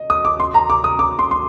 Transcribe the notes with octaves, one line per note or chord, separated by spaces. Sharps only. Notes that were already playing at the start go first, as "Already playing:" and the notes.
Already playing: D#5
D#6
D6
C6
A#5
D6
D#6
D6
C6
C6